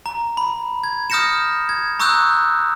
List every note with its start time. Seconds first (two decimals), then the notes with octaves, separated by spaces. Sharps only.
0.06 A#5
0.37 B5
0.84 G#6
1.10 D#6 F6 G6 A#6 C#7 E7
1.69 G#6
1.99 A#5 C#6 D#6 E6 F#6 G6